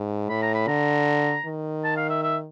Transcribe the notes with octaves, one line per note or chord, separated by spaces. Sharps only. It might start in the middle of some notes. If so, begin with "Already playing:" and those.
Already playing: G#2
A2 B5
A#5
B5
D3 A#5
D#3
A5
F5
E5
E5